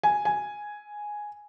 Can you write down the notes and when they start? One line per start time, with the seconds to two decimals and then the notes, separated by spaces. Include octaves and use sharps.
0.03 G#5
0.25 G#5